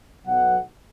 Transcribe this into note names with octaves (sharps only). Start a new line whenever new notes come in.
B1 B2 F#3 F#5